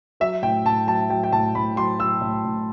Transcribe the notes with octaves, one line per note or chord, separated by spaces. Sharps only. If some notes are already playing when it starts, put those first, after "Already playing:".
F#3 E5
A2 G5
A2 A5
F#3 A5
F#3 G5
G5
A2 A5
A2 B5
F#3 C6
F#3 E6
A2
A2